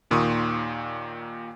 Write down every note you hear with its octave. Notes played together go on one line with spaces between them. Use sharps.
D#2 A#2 D#3 C6 C#6 D#6